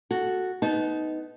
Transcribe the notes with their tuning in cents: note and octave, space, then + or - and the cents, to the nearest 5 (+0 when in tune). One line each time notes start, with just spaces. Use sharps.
F#4 +0 A4 +0
B3 +15 D#4 +5 A5 -35